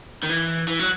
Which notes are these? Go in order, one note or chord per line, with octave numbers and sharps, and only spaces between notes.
D#3
E3
E3
F#3